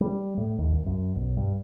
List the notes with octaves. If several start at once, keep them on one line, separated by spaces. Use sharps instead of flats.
G3
A2
D#2
C2
F#2
B1
G2